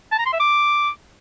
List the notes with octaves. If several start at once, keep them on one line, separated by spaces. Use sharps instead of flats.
A5
A#5
C6
E5
D6